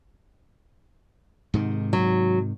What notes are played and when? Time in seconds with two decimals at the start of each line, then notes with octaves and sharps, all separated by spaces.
1.54 G#2 C3 D#3
1.93 F#3